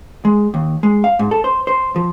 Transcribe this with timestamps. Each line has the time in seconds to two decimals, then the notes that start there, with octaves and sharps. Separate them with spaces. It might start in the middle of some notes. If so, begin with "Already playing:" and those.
0.25 G#3
0.54 D#2
0.83 G#3
1.04 F5
1.19 G#2
1.31 A4
1.44 C5
1.67 C5
1.96 F3